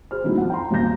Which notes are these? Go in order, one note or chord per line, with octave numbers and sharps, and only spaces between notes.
G#4 C5 F6
D#3 F#3 G3 A3 A#3 E4
F2 F#5
G5 A#5 C6
G#1 D#2 G3 A#5 G6 A#6